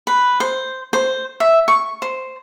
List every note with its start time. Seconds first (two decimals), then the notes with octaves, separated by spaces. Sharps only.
0.07 B4
0.40 C5
0.93 C5
1.40 E5
1.68 C#6
2.02 C5